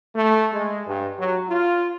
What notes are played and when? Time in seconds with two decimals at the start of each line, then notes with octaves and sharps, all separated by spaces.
0.16 A3
0.53 G#3
0.87 G2
1.19 F#3
1.49 F4